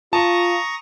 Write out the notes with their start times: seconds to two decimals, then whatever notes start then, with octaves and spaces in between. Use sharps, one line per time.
0.13 F4 A5 A#5 C#6 D#6